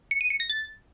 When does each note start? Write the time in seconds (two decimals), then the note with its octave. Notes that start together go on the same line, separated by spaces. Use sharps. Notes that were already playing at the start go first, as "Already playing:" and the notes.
0.11 C#7
0.21 D#7
0.30 C#7
0.40 A#6
0.50 A6